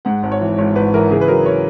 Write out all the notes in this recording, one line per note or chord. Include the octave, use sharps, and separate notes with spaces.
G#2 F#5
G#1
C#5
E3
G#1 C#5
G#1 B4
E3 A#4
C#3 G#4
B4
F#3 A#4
C#5